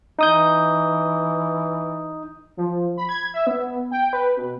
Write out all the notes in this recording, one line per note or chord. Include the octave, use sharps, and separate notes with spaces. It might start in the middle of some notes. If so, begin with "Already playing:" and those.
E3 D#4 D#6 G6
F3
B5
G#6
E5
B3
G5
B4
B2